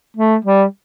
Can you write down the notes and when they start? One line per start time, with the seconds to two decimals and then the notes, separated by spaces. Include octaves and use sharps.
0.17 A3
0.45 G3